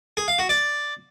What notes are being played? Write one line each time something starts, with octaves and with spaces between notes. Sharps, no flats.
G#4
F5
F#4
D5